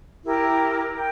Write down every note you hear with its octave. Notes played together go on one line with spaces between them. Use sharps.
E4 G4 A#4
G5